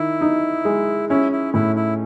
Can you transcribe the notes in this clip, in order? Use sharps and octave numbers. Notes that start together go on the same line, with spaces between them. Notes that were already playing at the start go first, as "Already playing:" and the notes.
Already playing: D#3 E4
D#4
G#3
C#4 E4
E4
A2 E4
E4